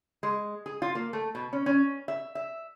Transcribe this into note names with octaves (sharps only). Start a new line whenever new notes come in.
G#3
G#4
F4
A#3
A3
B2
C#4
C#4
E5
E5